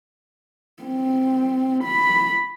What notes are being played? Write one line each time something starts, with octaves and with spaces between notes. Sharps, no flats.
C4
B5